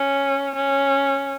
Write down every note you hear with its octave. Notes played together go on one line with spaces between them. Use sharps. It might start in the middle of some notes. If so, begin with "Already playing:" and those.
Already playing: C#4
C#4